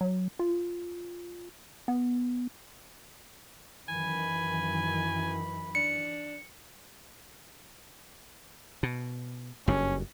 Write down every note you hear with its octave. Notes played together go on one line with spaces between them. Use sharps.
F#3
F4
B3
F#2 D#3 E3 G#5 B5
D4 C#7
B2
F#1 G2 C#4